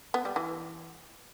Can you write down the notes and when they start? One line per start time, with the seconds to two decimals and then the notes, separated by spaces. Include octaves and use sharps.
0.14 B3
0.25 G3
0.36 E3